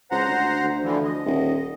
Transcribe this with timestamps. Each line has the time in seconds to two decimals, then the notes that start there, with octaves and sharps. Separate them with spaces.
0.11 C#2 C5 F#5 A#5
0.28 D2
0.64 D2
0.83 D3 E3 F3
1.04 D#5
1.25 D#1